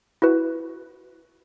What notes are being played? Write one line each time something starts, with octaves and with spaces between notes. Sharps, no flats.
E4 F#4 B4